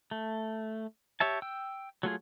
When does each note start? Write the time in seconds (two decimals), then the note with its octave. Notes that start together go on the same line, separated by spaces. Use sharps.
0.11 A3
1.20 G4 C#5 E5 A5
1.42 G5 E6
2.03 F#3 A3 F4 G#4